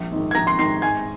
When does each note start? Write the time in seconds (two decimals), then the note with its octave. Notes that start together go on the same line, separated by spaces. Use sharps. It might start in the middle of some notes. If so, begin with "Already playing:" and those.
Already playing: A#1
0.12 G#2 D#3
0.31 G#6
0.35 A#1 A#5 A#6
0.47 C6 C7
0.59 G#2 D#3 C6 C7
0.82 G#2 G#5 G#6